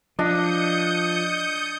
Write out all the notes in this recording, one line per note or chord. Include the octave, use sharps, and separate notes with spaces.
F3 D4 D#5 D#6 G6 C#7